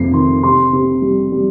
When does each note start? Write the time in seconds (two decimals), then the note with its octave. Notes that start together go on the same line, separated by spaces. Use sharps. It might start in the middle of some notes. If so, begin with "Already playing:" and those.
Already playing: F1 F2 C7
0.13 D#3 C6
0.43 C3 C6
0.73 C3
1.02 G3
1.32 G3